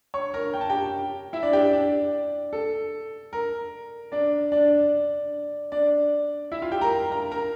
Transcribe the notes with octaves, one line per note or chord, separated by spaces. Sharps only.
C#5 C#6
A#4 A#5
G5
A5
G4 G5
E4 E5
D4 D5
G4 G5
D4 D5
A4
A#4
D4 D5
D4 D5
D4 D5
E4 E5
F4 F5
G4 G5
A#4 A#5
A#4 A#5
A#4 A#5